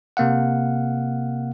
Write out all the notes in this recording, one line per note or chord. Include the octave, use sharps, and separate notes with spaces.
C3 A#3 F5 F#5